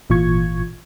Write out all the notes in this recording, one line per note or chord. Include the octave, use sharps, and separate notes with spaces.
G#1 A#2 E3 F4 C#6 G#6